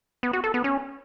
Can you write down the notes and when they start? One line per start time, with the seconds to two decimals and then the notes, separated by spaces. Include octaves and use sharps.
0.23 B3
0.33 F#4
0.44 A4
0.54 B3
0.64 C#4